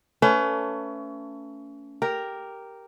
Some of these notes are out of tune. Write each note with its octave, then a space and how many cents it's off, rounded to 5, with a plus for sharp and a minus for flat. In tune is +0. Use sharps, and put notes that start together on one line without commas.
A3 +30 C#4 +30 B4 +35
G4 +0 A#4 +0